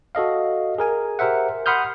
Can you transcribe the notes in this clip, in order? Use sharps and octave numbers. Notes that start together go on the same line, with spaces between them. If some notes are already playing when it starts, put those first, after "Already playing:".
F#4 A4 D#5 F5
G#4 A#4 G#5
G4 A#4 C5 E5 F#5
F#5 B5 C6 D#6 F6 G6